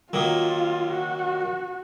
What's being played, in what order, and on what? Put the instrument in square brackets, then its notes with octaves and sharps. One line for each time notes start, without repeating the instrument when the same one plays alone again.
[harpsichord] D#3 F#3 A#3 [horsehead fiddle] F4
[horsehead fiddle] F#4